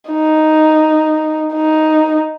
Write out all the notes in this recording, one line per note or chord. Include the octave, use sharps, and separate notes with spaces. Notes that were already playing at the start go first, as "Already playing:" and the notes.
D#4
D#4